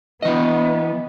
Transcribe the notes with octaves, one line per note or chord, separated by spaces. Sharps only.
E3 B3 D#5